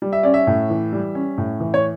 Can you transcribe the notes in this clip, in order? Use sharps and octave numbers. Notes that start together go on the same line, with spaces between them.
G3
E5
C#4 D5
E5
A2
E3
G3
C#4
A2
E3
C#5